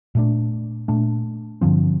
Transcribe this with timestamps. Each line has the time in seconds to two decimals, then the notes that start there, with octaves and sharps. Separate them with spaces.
0.15 A#2 A3 D4
0.88 A#2 A3 D4
1.61 G2 D3 F3 C4